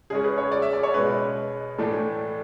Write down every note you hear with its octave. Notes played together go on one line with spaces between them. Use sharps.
C#3 G#3 C#4 G#4
B4
C#5
D5
E5
D5
C#5
B2 G#3 C#4 B4
A2 E3 A3 D4